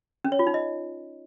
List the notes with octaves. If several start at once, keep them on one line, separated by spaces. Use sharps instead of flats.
C#4
C#5
F4
D#4
D#5